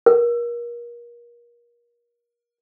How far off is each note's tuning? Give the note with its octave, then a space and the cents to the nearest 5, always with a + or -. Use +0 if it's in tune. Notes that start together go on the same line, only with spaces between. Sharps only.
A#4 +30